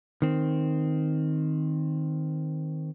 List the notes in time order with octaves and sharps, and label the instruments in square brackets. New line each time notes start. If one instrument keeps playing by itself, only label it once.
[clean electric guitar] D#3 C4